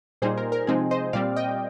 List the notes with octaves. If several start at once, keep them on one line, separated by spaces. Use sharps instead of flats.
A#2 G3 A#3 D#4 G#4 C5
A#4
A#4
C3 F3 G#3 C4 D#4 G#4
C5 D#5
A#2 G3 C4 D5 F5
D#5 G5